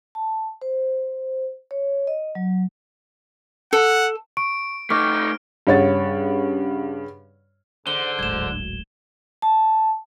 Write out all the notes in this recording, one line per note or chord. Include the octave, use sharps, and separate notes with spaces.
A5
C5
C#5
D#5
F#3
A4 F#5
C#6 D7
A3 D#4 C#6 D6 F6
G2 C#3 C#5 F#5 A6
G#2 D3 C5 G7
D1 G#1 G#6 E7
A5